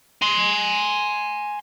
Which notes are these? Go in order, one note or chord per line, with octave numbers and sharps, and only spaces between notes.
G#5 C6